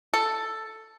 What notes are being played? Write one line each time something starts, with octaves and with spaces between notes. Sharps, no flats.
A4